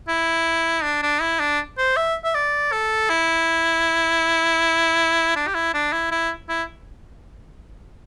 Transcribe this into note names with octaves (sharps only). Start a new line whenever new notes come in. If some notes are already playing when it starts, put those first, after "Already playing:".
E4
D4
D4
E4
D4
C5
E5
E5
D5
A4
E4
D4
G4
E4
D4
E4
E4
E4